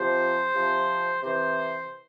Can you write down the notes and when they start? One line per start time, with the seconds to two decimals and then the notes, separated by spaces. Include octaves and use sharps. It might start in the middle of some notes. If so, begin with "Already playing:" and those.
Already playing: C3 F3 C5
0.54 C3 F3
1.22 C3 E3 C5